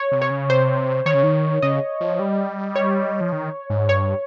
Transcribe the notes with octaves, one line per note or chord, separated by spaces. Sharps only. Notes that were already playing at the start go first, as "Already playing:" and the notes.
Already playing: C#5
C3
C#5
C#3
C3 C5
D#3 C#5
C#3
D#3
C#3 D#5
F3
G3
C#5
F3
D#3
G#2
G2 C#5